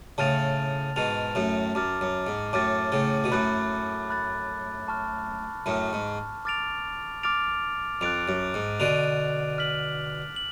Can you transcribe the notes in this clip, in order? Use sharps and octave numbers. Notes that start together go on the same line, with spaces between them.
A2 C#3 A5 F6 A6 F7
G#2 B2 A5 F6 A6 F7
F#2 A2
F#2 A5 D6 F6 A6
F#2
G#2
F#2 A2 A5 D6 F6 A6
A2 C#3
B2
F#2 A2 B5 F#6 A6
B5 F#6 A6
A5 C#6 F6
F#2 A2 A5 C#6 F6
G#2
D6 F6 A6 D7 F7
D6 F6 A6 D7 F7
F2 F#6 A6 D7 F7
F#2
G#2
B2 D3 F#6 A6 D7 F7
F6 B6 F#7
F#7